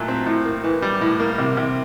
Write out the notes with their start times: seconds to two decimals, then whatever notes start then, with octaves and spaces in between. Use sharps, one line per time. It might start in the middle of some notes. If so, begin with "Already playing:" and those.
Already playing: A#2 F#3 A3
0.08 C4
0.26 A2
0.45 A#3
0.64 E3
0.82 G3
1.01 A2
1.20 A#3
1.38 C3
1.57 C3